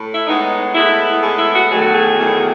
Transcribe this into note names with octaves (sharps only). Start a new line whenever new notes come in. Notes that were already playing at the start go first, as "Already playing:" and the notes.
Already playing: A2
E4
A2 G#3 B3 D#4
A2 G#3 B3 E4
A2 G#3 B3 G#4
E4
F#4
E2 D#3 F#3 A3 G#4
F#4
G#4
E2 D#3 F#3 A3